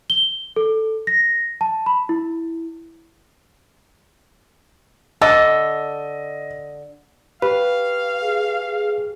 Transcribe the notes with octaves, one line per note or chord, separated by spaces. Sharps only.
G7
A4
A#6
A5
B5
E4
D3 A4 D#5
G4 B4 F5
G#4